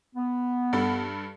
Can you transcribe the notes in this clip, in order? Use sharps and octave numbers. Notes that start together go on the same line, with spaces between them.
B3
G2 A4 B5